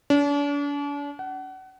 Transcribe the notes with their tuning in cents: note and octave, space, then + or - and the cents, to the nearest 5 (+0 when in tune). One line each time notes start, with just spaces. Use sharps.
D4 -40
F#5 +30